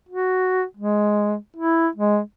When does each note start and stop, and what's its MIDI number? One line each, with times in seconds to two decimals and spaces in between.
0.09 0.64 66
0.77 1.35 56
1.56 1.88 64
1.95 2.19 56